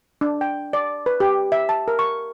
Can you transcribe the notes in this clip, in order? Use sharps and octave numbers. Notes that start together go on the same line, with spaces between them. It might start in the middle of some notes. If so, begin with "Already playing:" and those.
D4
G5
D5
B4
G4
E5
A5
A#4
C#6